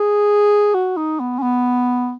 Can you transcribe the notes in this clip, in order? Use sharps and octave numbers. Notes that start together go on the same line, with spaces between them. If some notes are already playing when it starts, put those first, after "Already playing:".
Already playing: G#4
F#4
D#4
B3
C#4
B3